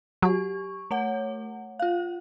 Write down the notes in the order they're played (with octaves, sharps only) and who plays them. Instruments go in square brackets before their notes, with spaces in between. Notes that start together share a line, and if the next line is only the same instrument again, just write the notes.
[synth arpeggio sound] F#3 [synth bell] G4 C#6
[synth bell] A3 C#5 F#5
F4 F5